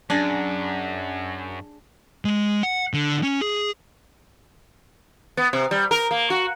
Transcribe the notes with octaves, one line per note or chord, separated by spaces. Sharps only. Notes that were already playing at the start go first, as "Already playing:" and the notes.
F#2 D4 G#4
G#3
F#5
D3
C#4
G#4
B3
C3
G3
A#4
A#3
F#4